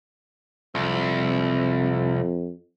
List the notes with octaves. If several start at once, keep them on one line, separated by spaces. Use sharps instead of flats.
C2 F2